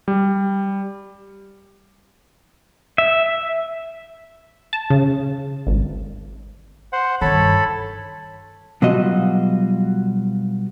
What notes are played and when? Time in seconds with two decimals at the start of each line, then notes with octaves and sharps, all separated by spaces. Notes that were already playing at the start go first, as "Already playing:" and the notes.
0.08 G3
2.98 E5
4.73 A5
4.90 C#3
5.67 G#1
6.93 C5 F#5
7.21 G2 D#3 A4 C#5 B5
8.82 B2 F#3 G3 F4 F#4 D#5